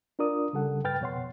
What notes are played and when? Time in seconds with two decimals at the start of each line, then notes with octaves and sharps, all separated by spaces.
0.19 D4 F4 A#4 D5 D#6
0.53 C#3 G3 A4 F#5
0.84 G2 B4 G5 F6 A6
1.01 F2 B2 C#5 F#5 C6